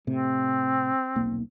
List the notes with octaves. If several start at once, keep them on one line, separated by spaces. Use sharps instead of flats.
A2 C3 C4
D#1 B1 A#3